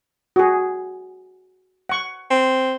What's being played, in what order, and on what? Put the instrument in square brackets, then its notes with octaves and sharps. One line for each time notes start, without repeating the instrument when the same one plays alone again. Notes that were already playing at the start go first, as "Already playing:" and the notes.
[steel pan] F#4 G#4
F#5 C#6
[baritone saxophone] C4